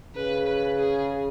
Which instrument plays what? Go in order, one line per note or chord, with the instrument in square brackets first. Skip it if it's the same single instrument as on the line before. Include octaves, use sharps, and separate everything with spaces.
[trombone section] C#3 [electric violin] B4
[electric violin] B4
G#4